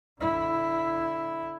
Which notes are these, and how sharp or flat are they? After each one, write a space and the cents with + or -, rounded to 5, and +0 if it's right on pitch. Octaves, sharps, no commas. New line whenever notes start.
D3 -15 E4 +0